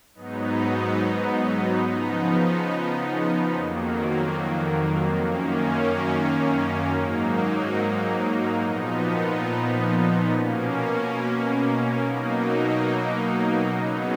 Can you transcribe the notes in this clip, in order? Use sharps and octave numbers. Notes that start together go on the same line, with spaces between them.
G#2 F#3 B3 D#4
C#3 F3 B3 D#4
F2 D#3 F#3 A#3
F#2 D#3 A#3 C#4
G#2 F#3 A#3 D#4
A#2 F3 B3 D#4
B2 A#3 C#4
B2 F#3 A#3 D#4
C#3 F#3 B3 D#4